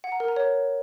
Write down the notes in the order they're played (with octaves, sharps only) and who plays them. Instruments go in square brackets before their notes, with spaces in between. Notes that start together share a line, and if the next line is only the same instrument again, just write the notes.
[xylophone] F#5
A#5
A#4
A#5
C#5